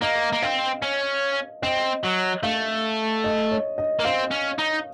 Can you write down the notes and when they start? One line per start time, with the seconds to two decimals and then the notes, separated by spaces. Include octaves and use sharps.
0.02 A#3 D#5
0.33 A#3
0.42 C4 F5
0.82 C#4
1.62 C4 D#5
2.04 F#3
2.43 A3 F5
3.24 D#5
3.51 C#5
3.78 D#5
4.00 A#3
4.04 C4 F5
4.31 C#4
4.59 D#4